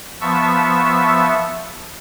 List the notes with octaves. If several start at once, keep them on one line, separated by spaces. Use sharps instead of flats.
F3 B3 E5 A5 C#6 E6